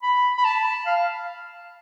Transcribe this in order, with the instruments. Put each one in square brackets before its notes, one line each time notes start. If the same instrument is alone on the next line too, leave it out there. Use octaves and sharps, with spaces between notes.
[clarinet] B5
B5
A5
F5